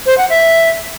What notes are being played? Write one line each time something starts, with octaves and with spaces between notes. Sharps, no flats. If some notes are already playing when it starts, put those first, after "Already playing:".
C5
F#5
E5